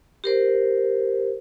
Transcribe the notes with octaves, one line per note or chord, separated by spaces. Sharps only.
G4 A#4 C5